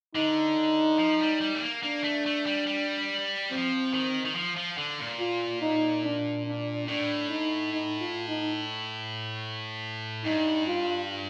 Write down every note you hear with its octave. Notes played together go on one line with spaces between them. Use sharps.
D3 D#4
F3
G3
G3
A3
A#3
A#3 D4
A3
A3
G3
G3
F3 C4
D#3
D#3
F3
F3
D3
A#2
F4
D#4
D4
D4
A2 D4
D#4
D#4
F4
D#4
G2 D#4
F4